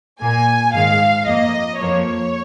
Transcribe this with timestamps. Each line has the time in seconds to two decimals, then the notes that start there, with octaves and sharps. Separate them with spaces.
0.20 A#2 A#3 G#5
0.73 G#2 D#3 G#3 F5
1.26 F2 F3 A#3 D#5
1.80 F2 F3 A#3 C#5